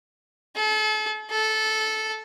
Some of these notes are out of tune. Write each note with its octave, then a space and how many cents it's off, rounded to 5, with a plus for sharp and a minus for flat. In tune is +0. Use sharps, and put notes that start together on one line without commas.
A4 -40
A4 -15